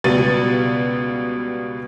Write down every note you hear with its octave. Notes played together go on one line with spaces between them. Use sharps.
C#2 B2 G3 B3 A6 D#7